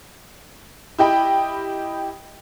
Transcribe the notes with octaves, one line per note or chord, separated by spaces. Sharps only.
E4 G4 D#5 G5 B5